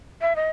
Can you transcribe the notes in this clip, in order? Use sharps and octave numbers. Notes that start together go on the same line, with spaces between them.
E5
D#5